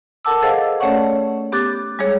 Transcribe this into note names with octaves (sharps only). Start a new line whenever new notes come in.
A4 A#4 F#5 A5 D6 E6
G#4 A4 C5 D#5 F5 F#5
A3 C#4 C#5 D5 F#5 C#6
B3 G4 D6 F#6 A6
G3 G#3 G#4 C#5